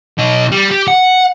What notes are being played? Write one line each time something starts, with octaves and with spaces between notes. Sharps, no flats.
B1 D#5
G3
G4
F#5